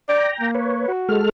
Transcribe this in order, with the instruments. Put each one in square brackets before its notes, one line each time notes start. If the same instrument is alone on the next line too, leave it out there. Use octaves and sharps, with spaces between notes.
[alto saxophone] D5 [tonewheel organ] G5 A#5
[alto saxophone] A#3
[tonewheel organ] B4 C#5
[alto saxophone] F#4
[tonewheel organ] G#3 A4 F6